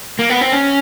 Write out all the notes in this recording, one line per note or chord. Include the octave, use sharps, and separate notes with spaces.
A#3
B3
C4
C#4